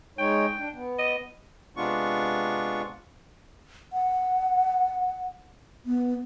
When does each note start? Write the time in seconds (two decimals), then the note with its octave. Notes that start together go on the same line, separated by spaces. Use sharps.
0.18 G#3 D#4 C#5 G5
0.59 D4
0.74 B3
0.98 D#5
1.77 C3 G#3 B3 D4 F4 C#6
3.93 F#5
5.86 B3